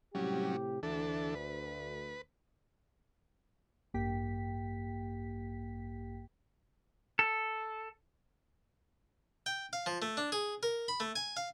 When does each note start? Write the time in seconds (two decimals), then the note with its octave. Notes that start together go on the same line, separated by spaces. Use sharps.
0.15 A2 C3 F#3 G3 C#4 G4
0.83 D2 E3 D4 A4
1.35 B4
3.94 A1 G2 A#3 G4 G5 B6
7.19 A4
9.46 G5
9.73 F5
9.86 F3
10.02 A3
10.17 D4
10.32 G#4
10.63 A#4
10.88 B5
11.00 A3
11.16 G#5
11.37 F5